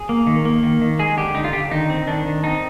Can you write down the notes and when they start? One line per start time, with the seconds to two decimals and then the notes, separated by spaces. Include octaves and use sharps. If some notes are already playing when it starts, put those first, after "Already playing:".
Already playing: G#4
0.09 A#3
0.27 D#3
0.45 A#3
0.63 D#3
0.81 D#3
0.99 G#3 G#4
1.17 D3 G4
1.35 D3 D#4
1.45 F4
1.53 D3 G4
1.71 D#3 D#4
1.90 C4
2.07 D#3 D4
2.26 D#3
2.44 C4 D#4